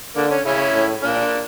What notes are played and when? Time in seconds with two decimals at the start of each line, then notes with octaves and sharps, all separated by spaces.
0.16 D3 A#3 D4
0.31 C#4
0.45 C#3 C#4 E4
0.74 A2
1.03 A#2 A#3 D4